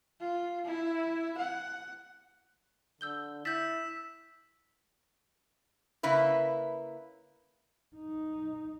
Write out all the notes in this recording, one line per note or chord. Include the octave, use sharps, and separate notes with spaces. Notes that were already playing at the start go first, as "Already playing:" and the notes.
F4
E4
F#5
D3 E6 G6 G7
E4 E6 G6 A6 B6 E7
C#3 A#3 E4 B4
D#4